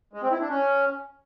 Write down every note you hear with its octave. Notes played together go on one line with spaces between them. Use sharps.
G#3
C4
E4
D4
C#4